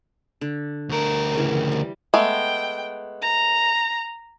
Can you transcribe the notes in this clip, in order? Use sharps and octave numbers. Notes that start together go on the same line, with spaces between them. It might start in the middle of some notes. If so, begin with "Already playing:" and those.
D3
D2 A#4
C#3 E3
G3
G#3 A3 B3 G5
A#5